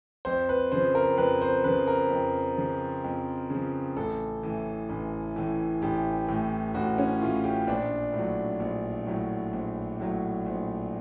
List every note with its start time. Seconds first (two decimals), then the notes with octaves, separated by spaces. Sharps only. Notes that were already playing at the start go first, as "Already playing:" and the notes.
0.25 F2 C5
0.49 B4
0.72 C#3 F3 C5
0.95 A#4
1.18 F2 B4
1.42 C5
1.64 C#3 F3 B4
1.88 A#4
2.11 F2
2.57 C#3 F3
3.04 F2
3.50 C#3 F3
3.96 A1 A4
4.43 A2 E3
4.89 A1
5.36 A2 E3
5.82 A1 G4
6.28 A2 E3
6.74 A1 F#4
6.98 C#4
7.21 A2 E3 F4
7.44 G4
7.67 A#1 D4
8.13 A2
8.19 F#3
8.60 A#1
9.07 A2 F#3
9.53 A#1
10.00 A2 F#3
10.46 A#1